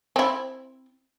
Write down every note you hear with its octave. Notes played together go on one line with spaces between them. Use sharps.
C4 E4